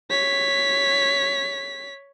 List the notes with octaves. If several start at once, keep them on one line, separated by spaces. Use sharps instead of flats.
C#5 B6